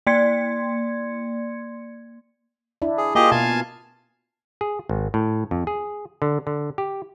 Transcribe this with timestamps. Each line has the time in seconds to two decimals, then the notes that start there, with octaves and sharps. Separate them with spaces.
0.07 A#3 D5 C6 G#6 C#7
2.82 D4 E4
2.98 G#4
3.15 A#3 F4 G4 G#4 D#5
3.31 B2 F5 G#5 A5
4.61 G#4
4.89 G#1
5.14 A2
5.51 F2
5.67 G#4
6.22 D3
6.47 D3
6.78 G4